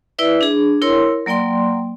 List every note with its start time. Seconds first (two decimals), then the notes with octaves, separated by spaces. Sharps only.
0.19 E4 B4 D5 E5
0.41 D4 G#4
0.82 E4 A#4 C#5 C6
1.26 F#3 A#3 D5 G5 C6